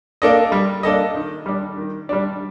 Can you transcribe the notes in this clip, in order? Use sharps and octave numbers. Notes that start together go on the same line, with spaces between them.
A#3 D4 A4 D#5
G3
A#3 D4 A4 D#5
D#3
G3 D4
D#3
G3 D4